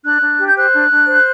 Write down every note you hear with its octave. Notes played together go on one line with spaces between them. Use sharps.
D4 F#6
D4
G4
G6
C5 F#6
D4
D4
C5